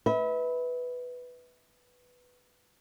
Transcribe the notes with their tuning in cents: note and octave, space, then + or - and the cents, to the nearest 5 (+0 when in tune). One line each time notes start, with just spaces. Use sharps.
B4 +0 E5 -35